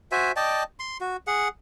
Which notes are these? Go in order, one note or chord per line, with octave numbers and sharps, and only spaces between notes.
F#4 C5 E5 G#5
D5 D#5 G5 A5
C6
F#4
G#4 F#5